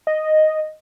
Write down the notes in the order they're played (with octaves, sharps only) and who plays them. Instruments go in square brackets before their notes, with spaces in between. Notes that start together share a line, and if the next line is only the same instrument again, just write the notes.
[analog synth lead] D#5